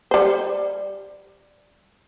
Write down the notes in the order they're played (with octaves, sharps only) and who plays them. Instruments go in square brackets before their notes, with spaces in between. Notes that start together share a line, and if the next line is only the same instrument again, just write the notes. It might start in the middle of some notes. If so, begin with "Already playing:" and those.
[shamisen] G3 C5